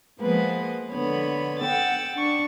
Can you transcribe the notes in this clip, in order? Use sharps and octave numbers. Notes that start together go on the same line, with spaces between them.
F3 G#3 A#3 B3 B4
D3 B3 C#5 B5
F#5 G5 E6 A6
D4 C#6